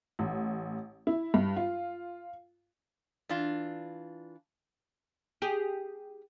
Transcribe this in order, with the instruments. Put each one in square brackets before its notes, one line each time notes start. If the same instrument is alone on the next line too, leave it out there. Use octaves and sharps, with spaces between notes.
[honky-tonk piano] A1
E4
G2
F4
[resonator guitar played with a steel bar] E3 D4 F4
[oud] G4 G#4